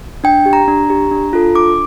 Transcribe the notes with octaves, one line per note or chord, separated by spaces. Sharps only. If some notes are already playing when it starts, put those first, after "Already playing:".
D4 G5
G4
A#5
D4
G4
D4
F4 A4
D4 D6